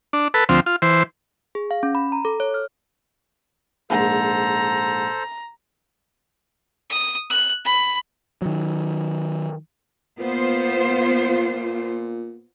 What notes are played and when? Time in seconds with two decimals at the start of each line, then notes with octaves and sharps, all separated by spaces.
0.13 D4
0.34 A4 B4
0.49 D2 F3 C4
0.66 F4
0.82 E3 C5
1.55 G#4
1.71 F5
1.83 C#4
1.95 B5
2.12 A#5
2.25 A4
2.40 C#5
2.54 F6
3.90 A#1 G#2 A4 C5 A#5
6.90 D#6
7.30 F#6
7.65 B5
8.42 D#3 F#3
10.19 A#2 B3 F4 C5